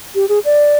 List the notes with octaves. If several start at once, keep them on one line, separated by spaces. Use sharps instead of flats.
G4
G#4
D5